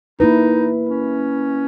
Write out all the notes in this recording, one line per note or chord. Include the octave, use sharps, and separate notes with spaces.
A#3 D#4 E4 B4
C#4